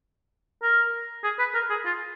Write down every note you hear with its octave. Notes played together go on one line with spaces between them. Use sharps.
A#4
G#4
B4
A#4
G#4
F4